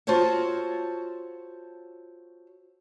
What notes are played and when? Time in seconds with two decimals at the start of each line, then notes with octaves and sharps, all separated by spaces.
0.07 F4 F#4 A4 C5 C#5